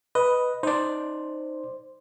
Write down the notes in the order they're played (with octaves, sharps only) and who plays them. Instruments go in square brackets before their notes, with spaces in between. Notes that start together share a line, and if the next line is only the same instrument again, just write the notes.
[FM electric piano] B4 [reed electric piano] D#5
[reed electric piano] D#4 D5 [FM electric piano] C5